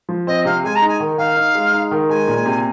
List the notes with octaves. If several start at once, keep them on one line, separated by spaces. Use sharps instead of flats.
F3
C4 D#5
C3 F5
G#3 G#5
A#5
D#4
G#5
D#3
D#3 F5
D#4
G#3
D#4
D#3
G#3 G#5
A#2
C3